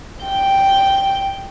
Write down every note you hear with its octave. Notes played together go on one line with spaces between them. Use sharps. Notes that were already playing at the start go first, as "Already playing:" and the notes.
G5